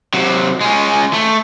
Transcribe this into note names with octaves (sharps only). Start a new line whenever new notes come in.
C3 F#3
G#3 C#4
A3